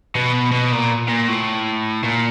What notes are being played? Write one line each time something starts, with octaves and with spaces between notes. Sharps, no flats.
B2
B2
A#2
A#2
A2
A#2